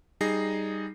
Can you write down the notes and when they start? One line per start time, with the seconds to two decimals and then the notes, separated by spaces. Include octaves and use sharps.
0.21 G3 D#4 G#4 A#6 C7